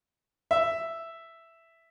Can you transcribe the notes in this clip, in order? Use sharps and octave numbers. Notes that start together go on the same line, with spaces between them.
E5